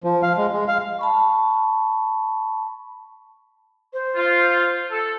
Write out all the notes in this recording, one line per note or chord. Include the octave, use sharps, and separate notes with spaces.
F3
F5
G#3
G#3
F5
A5 B5 C#6
C5
F4
A4